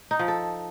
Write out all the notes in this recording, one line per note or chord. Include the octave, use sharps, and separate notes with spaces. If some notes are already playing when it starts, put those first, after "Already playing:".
D#4
F3
A4